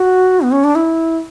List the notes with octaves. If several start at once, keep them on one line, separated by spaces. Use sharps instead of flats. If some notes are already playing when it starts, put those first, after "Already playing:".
Already playing: F#4
B3
C#4
D4
E4